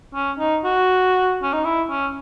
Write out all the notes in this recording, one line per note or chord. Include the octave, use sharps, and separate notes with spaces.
C#4
D#4
F#4
C#4
D#4
E4
C#4